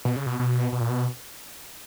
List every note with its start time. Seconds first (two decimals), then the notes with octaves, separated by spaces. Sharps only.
0.05 B2
0.16 C#3
0.26 B2
0.39 B2
0.72 B2
0.81 A#2
0.90 B2